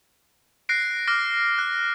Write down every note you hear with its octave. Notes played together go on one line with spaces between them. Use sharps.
F#6 A#6 C7 D7
D6 F6 A#6
F#6